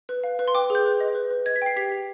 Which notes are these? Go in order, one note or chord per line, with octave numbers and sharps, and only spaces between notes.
B4
F5
B4
C6
G5 D6
G#4
G6
B4
D#5
B4
B4
D#5 G#6
B6
G5 C7
G4 B6
G4